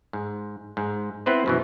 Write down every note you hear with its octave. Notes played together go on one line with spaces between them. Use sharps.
G#2
G#2
B3 C4 E4 B4 C5
F#2 B2 E3